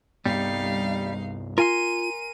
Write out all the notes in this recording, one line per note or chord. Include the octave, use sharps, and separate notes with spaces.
C2 G2 G3 B3 D#4 F5
F4 A#4 G#5 C6 D#7